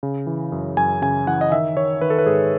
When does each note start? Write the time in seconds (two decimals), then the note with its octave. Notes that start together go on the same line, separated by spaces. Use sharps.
0.03 C#3
0.27 E3
0.52 F#2
0.77 F#2 G#5
1.02 C#3 G#5
1.27 E3 F#5
1.41 D#5
1.52 D#3 E5
1.77 D#3 C#5
2.01 D#3 B4
2.10 A4
2.18 B4
2.26 G#2 G#4